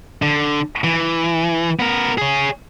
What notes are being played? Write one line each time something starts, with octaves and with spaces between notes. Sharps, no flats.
D3
E3
B3 A#4
G#4 C#5